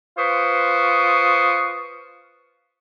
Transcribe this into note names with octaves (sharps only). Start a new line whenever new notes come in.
F4 B4 C5 C#6 D#6